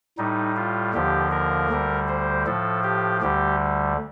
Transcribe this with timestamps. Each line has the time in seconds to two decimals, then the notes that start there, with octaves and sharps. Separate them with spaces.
0.18 A2 G3 D#4
0.56 F4
0.94 D#2 D3 F3 G4
1.31 A#4
1.70 D2 D3 G3
2.08 C5
2.46 A2 F3 A4
2.83 G4
3.22 D2 D3 G3 G4